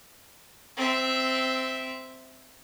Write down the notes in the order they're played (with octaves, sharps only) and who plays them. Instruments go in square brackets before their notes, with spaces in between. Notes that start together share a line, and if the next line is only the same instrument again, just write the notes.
[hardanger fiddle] C4 E5